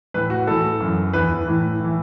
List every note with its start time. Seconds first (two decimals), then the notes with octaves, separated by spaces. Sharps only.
0.14 A2 E3 B4
0.30 F#4
0.47 A2 E3 A4
0.80 F#2 E3
1.13 E2 E3 B4
1.47 A2 E3
1.80 A2 E3